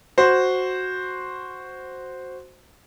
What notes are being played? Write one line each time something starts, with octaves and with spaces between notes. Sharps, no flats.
F#4 C5